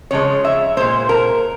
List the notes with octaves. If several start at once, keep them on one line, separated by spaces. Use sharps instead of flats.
C#3 F3 G#3 C#5
E5
A#2 G#3 C5
A#4